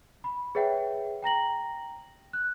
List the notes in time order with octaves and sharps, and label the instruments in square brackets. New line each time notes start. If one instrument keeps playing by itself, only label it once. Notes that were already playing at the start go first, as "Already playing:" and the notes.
[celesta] B5
G#4 B4 C#5 E5 F#5 G5
G5 A#5 A#6 F#7
F#6